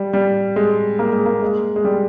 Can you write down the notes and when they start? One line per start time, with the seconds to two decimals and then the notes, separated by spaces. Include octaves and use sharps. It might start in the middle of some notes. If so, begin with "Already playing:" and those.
Already playing: G3
0.14 G3
0.56 G#3
0.99 A#3
1.13 G#3
1.26 A#3
1.42 G#3
1.76 G#3
1.85 G3